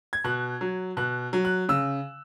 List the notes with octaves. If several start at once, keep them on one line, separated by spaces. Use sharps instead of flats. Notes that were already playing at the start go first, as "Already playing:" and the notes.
G#6
B2 F#6
F#3
B2 F#6
F#3
F#6
C#3 E6